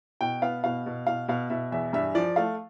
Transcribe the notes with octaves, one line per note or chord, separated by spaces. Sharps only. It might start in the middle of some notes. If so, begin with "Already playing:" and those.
B2 G5
B3 F5
B2 F5
B2
B2 F5
B2 F5
B2 E5
E2 E5
G2 E5
F3 D5
A3 F5